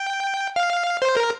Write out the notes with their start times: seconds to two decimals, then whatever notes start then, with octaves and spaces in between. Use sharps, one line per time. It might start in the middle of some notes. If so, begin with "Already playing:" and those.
Already playing: G5
0.56 F5
1.02 C5
1.17 A#4